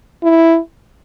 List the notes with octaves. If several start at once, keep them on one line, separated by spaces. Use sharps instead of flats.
E4